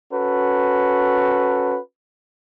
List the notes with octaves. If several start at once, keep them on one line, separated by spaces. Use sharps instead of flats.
C#4 F#4 A4 B4